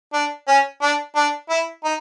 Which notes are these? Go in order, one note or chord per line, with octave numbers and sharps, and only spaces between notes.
D4
C#4
D4
D4
E4
D#4